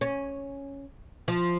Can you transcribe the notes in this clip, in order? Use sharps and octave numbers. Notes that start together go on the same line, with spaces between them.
C#4
F3